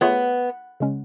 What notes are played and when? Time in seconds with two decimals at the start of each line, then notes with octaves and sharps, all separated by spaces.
0.01 A3 B3 F4 G#4 C#5
0.80 C#3 G#3 C#4